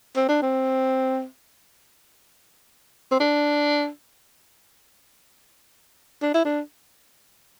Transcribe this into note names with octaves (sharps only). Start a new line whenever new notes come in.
C4
D4
C4
C4
D4
D4
E4
D4